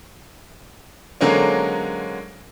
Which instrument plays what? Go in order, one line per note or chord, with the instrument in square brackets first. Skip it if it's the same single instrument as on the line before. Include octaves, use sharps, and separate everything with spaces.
[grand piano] D3 F#3 G#3 A#3 C4 C#4